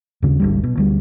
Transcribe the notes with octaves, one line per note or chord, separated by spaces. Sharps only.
D#2 C#3
G#1 D2 G3
B2
D2 G3